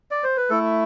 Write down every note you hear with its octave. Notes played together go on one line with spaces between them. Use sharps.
D5
C5
B4
A3 E4 A4